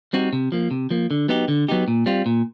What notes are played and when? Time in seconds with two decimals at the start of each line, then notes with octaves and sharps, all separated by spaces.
0.13 G3 C4 D#4 F#4
0.33 C3
0.52 F3 A#3
0.71 C3
0.91 F3 A#3
1.11 D3
1.28 F#3 B3 D#4 G4
1.48 D3
1.68 F#3 B3 D#4 G4
1.88 A#2
2.06 G3 C4 F4
2.26 A#2